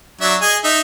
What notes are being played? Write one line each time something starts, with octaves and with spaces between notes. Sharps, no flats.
F#3 D4 E5
G#4 D#5 G#5
D#4 E5